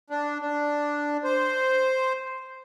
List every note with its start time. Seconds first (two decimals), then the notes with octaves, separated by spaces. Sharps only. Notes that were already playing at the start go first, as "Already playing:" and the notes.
0.10 D4
0.41 D4
1.24 C5